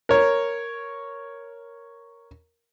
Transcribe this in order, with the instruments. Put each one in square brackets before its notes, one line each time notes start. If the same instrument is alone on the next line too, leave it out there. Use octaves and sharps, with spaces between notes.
[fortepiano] A#4 C#5